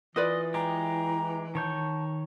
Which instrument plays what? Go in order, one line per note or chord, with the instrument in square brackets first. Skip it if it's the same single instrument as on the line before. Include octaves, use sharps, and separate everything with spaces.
[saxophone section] E3 [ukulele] F4 B4 D5 [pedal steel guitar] D#5
[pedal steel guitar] G#3 G4 [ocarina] A#5
[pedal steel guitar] D#3 C#5 G6 [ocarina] A5